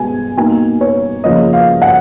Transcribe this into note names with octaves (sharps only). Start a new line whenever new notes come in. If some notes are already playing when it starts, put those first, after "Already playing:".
Already playing: B2 G#3 B3 G#5
B2 A#3 D#4 G#5
C#5
C#3 F3 A#3 C#4 D#5
F5
F#5